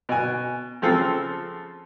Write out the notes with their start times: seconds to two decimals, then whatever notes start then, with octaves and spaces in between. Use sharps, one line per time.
0.09 B2 G#5
0.82 C#3 F3 C4 A4